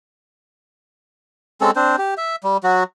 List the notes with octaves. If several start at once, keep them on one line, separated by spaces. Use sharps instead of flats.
G#3 C4 C#4 A4
C4 D4 C5
G4
E5
G3
F#3 F#4